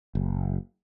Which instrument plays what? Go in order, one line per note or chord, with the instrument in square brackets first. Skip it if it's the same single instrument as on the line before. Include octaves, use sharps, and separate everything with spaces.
[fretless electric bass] F#1